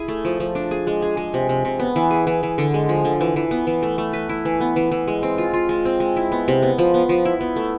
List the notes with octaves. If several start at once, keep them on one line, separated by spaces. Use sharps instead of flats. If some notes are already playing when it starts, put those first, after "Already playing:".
Already playing: E4 G#4
A3
F3
F3
D4
G#4
G#3
G#4
G#3
C3
C3
C3
B3
E3
G#4
E3
E3
D3
G#3
F3
D3
E3
E3
B3
E3
A3
A3
B4
E4
E3
B3
E3
E3
G#3
C4
F4
F4
G#3
C4
G#3
E4
B3
C3
B3
F3
B3
F3
E4
B3
A3